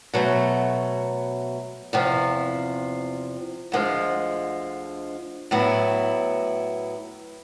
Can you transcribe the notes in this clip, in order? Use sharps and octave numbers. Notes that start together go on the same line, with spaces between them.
B2 F#3 A3
E2 C3 F3
D2 D3 F3 G#3
A2 F#3 B3 E4